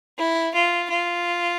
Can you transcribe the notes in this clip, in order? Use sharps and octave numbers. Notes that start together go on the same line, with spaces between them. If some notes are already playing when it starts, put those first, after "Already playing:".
E4
F4
F4